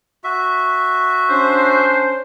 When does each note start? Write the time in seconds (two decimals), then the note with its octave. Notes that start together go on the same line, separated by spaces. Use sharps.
0.24 F#4 E5
1.30 C#4 D4 C5